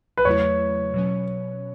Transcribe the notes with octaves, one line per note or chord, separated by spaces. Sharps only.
B4
E2 C#3 F#3 A3 E4 C#5
B2 F#3 C#4